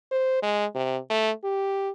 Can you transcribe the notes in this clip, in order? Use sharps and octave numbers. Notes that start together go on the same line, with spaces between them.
C5
G#3
C3
A3
G4